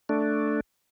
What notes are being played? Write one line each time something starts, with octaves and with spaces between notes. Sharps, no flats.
A3 D4